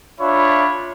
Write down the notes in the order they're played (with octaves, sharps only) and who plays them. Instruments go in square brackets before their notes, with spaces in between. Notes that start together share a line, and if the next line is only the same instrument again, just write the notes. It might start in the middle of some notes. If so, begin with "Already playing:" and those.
[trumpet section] D4 F4 C#5 E5 B5